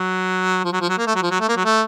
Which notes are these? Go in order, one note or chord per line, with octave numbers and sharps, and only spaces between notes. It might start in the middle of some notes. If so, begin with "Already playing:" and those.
Already playing: F#3
F3
F#3
F3
F#3
A#3
A3
F#3
F3
F#3
A3
A#3
F#3
A3